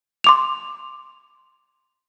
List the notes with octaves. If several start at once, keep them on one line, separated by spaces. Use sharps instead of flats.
C6 D6 F7